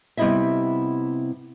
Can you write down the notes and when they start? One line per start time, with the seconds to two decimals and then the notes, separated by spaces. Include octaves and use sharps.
0.17 C3 G3 B3 E4 D#5 E5